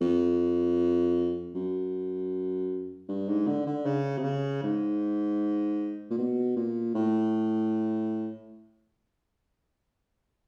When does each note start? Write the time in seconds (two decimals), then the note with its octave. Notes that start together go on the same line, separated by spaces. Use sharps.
0.01 F2
1.55 F#2
3.09 G2
3.28 G#2
3.47 D3
3.67 D3
3.86 C#3
4.18 C3
4.24 C#3
4.63 G#2
6.10 A#2
6.17 B2
6.56 A#2
6.95 A2